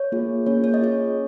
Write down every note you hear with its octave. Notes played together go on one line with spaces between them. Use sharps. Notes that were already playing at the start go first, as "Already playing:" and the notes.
Already playing: C#5
A#3 F4 G#4
A#3 C#4 G#4 C#5
C#5
D#5
C#4 F4 G#4 C#5